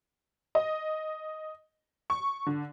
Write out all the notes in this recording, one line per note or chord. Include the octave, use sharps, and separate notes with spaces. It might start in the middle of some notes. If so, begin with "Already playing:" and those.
D#5
C#6
D3